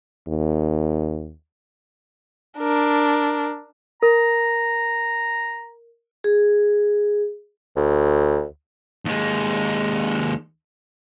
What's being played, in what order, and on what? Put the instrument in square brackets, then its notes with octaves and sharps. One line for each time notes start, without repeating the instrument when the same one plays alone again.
[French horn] D#2
[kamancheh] D4 A#4
[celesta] A#4 [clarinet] A#5
[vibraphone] G#4
[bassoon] D2
[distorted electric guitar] D#2 G#3